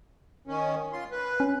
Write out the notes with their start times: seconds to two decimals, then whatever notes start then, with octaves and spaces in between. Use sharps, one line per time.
0.48 D#3 C#4
0.93 F4 C6
1.11 B4
1.40 C#4